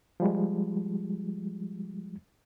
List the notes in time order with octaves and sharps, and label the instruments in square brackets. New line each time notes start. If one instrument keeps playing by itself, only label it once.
[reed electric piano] F3 G3 G#3